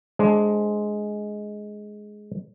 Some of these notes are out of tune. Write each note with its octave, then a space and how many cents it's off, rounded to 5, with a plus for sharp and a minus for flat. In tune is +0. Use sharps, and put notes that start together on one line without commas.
G#3 +10 D4 +0 C5 +0